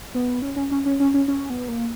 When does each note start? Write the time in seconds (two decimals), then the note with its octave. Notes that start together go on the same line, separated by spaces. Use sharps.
0.15 B3
0.42 C#4
0.56 C#4
0.71 C#4
0.86 C#4
1.00 C#4
1.14 C#4
1.28 C#4
1.50 B3
1.68 A#3